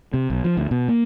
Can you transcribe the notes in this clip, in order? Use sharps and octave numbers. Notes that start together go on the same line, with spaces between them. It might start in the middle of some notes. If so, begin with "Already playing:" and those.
C3
B1
F3
D2
B2
A#3